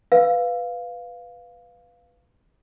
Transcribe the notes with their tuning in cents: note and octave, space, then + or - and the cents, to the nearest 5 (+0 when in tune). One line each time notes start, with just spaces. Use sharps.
B4 +5 F5 +0